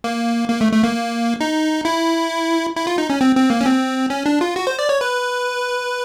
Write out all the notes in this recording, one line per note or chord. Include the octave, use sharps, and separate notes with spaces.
A#3
A#3
A3
A3
A#3
D#4
E4
E4
F4
D#4
C#4
C4
C4
A#3
C#4
C4
C#4
D4
F4
F#4
C5
D5
C#5
B4